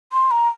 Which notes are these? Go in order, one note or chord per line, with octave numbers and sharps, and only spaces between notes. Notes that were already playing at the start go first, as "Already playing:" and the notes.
C6
A#5